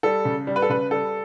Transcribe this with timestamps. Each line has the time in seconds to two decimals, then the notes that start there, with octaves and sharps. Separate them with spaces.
0.03 G3 A4
0.25 C#3
0.47 G3
0.56 B4
0.62 A4
0.69 C#3 B4
0.91 G3 A4